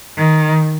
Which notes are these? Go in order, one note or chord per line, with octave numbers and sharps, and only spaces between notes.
D#3